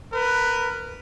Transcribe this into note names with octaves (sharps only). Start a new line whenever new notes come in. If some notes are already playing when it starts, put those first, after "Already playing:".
A#4 B4